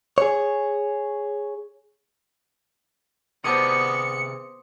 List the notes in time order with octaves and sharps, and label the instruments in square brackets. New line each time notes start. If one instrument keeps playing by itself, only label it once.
[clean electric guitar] G#4 C#5
[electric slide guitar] C3 G#4 A5 [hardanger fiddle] B3 [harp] C5 D6 D#6 [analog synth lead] C#7